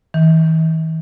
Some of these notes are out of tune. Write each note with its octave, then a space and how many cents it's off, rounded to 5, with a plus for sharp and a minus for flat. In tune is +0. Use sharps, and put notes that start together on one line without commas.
E3 -45